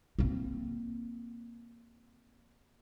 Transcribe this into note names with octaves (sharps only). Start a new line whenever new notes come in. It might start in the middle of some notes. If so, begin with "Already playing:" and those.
A#3 C4